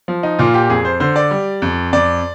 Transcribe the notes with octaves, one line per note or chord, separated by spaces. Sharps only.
F3
D#4
A#2 F4
G4
F2 G#4
C5
D3 C5
D5
G3
F2
F2 D5